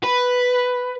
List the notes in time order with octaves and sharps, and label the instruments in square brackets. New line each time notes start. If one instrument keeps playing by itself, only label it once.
[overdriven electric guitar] B4